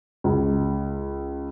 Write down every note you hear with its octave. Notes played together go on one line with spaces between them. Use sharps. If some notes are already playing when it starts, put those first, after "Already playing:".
C#2